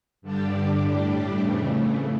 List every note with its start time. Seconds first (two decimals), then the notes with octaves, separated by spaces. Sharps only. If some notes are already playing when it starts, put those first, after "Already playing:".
0.22 G2 D3 G3 D4 G4
0.80 A2 G3 D4 G4
1.39 F2 C#3 E3 A3